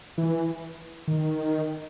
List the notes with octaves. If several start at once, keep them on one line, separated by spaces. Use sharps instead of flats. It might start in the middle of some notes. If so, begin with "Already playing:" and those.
E3
D#3